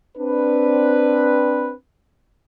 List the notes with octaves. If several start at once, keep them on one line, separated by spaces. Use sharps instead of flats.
C4 D4 B4